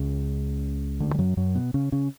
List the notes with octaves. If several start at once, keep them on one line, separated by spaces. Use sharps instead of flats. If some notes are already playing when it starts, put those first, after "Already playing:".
Already playing: C#2 C#3
D2 D3
G3
F#2 F#3
F#2 F#3
B2 B3
C#3 C#4
C#3 C#4